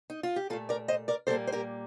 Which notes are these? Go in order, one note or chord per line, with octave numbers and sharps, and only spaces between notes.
D#4
F4
G4
A#2 A3 F4 A4
A#4 D5
C5 D#5
A#4 D5
A#2 G3 A#3 A4 C5
C5
G4 A#4